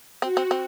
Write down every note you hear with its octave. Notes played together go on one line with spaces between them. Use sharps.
C4 F#4
C4
C4